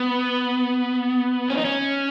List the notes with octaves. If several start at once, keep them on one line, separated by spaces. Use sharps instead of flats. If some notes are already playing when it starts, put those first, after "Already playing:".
Already playing: B3
C#4
D#4
C#4